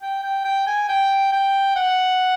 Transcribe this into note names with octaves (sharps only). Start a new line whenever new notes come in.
G5
G5
G5
G#5
G5
G5
F#5